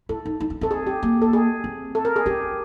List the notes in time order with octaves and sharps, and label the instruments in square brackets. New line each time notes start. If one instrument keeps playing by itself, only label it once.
[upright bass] E4 [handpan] A4
[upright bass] D#4
D#4
D4
[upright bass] C4 [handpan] A4
[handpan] G#4
G4
[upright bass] A#3
[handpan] A4
G#4
[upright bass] C4
[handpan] A4
A#4
G#4
[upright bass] C#4 [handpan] G4